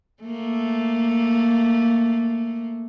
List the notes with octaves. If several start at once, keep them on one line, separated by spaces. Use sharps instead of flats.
A3 A#3